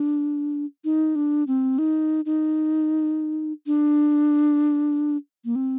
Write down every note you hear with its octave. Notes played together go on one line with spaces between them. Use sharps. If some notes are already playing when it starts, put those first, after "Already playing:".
Already playing: D4
D#4
D4
C4
D#4
D#4
D4
A#3
C4